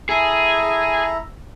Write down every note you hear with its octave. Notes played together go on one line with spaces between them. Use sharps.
E4 G#4 A4 A#5